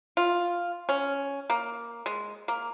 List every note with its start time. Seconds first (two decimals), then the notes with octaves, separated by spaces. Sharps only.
0.17 F4
0.89 C#4
1.50 A#3
2.06 G#3
2.48 A#3